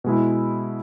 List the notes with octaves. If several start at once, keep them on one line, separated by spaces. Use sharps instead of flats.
B2 G#3 E4